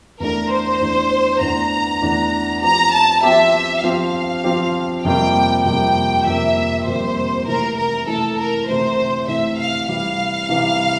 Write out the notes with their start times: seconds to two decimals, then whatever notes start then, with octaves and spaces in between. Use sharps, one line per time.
0.20 E2 E3 A3 D4 A#4
0.51 C5
0.81 E2 E3 A3 D4
1.41 E2 E3 A3 D4 A#5
2.02 E2 E3 A3 D4
2.62 F3 C4 G4 A#5
2.92 A5
3.23 F3 C4 G4 E5
3.83 F3 C4 G4 F5
4.44 F3 C4 G4
5.05 F2 C3 G3 A#3 G5
5.65 F2 C3 G3 A#3 G5
6.26 F2 C3 G3 A#3 E5
6.86 F2 C3 G3 A#3 C5
7.46 C3 E3 A3 E4 A#4
7.76 A#4
8.06 C3 E3 A3 E4 A4
8.37 A#4
8.67 C3 E3 A3 E4 C5
9.28 C3 E3 A3 E4 E5
9.58 F5
9.88 C3 E3 G3 F5
10.49 C3 E3 G3